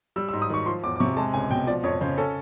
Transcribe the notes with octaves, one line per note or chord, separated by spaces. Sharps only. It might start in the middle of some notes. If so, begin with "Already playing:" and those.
G3 E6
E6
G#2
D#6
D#3 C#6
F3 C6
E2 D6
D6
C3 C#6
G#3 A5
C#2 G#5
B2 G5
F3 D5
F2 C#5
C#3 C5
C#4 A4